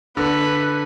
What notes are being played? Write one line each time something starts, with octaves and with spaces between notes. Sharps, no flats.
D3 B4